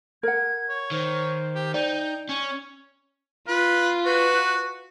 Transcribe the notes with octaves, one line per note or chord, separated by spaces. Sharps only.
A#4 F#5 G#6
C#5
D#3 C5
G4
D#4 D5 G5
C#4 C#5
F4 B4
F#4 B4